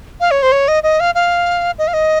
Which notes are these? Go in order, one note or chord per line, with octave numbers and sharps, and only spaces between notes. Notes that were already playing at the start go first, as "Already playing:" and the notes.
F5
C#5
C5
C#5
D#5
D#5
F5
F5
D#5
F5
D#5